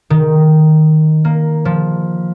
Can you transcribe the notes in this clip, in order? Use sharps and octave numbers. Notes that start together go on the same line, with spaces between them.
D#3
A#3
F3